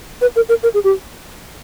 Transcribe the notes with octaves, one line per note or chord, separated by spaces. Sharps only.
B4
A#4
A#4
A#4
G#4
G4